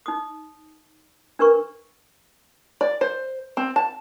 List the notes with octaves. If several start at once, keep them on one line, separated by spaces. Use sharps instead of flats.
D#4 D#6
D4 A#4 B4 C#6
D5
C5
C4
A5